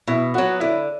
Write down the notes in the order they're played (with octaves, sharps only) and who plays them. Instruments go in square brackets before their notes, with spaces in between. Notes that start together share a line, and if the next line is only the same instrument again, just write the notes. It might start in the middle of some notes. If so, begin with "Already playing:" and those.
[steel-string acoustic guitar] B2 [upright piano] E4
[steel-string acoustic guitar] F#3 B3 [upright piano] F#4
[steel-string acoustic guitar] D3 [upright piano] E4